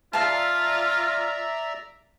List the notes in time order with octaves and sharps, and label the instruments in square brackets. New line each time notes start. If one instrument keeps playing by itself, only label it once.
[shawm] F4 [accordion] D5 E5 A#5 [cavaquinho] F5 A5